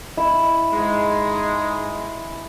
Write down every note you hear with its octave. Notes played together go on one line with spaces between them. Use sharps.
E4
G#2 G#3